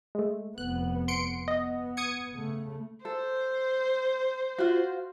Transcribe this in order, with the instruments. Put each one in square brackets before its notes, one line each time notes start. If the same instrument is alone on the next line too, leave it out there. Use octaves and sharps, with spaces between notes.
[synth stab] G#3 A3
[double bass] F1 B3 [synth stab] F#6
[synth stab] C6 C#7 D7
[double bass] B3 [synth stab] D#5
[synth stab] D#6 G#6 C#7
[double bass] C#3 A3
[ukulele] A4 [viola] C5
[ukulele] F4 F#4